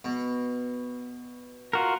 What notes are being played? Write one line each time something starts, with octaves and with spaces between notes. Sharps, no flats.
B2
F4 F#4 A#4